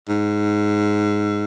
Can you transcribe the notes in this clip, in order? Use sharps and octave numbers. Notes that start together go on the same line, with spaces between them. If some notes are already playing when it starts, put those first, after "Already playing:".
G#2